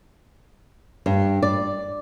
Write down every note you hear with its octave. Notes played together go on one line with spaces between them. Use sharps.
G2
D5